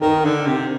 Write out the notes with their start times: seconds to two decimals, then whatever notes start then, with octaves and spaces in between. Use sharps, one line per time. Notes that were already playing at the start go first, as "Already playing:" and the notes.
0.01 D#3 A#4
0.25 D3
0.47 C3